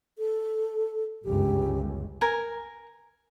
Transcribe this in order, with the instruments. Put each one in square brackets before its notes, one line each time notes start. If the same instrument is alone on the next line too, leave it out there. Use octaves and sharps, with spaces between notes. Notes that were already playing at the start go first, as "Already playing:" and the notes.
[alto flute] A4
[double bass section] G1 C#2 F#2 [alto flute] G4
[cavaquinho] A#4 G#5